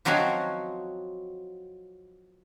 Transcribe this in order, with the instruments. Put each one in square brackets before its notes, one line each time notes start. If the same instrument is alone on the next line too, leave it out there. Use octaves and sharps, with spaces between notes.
[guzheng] F3 F#3 C4 D#4 F#4 C#5